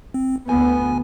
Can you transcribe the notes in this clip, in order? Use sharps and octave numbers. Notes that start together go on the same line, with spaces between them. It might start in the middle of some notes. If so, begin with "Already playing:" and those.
C4
D2 B3 G#5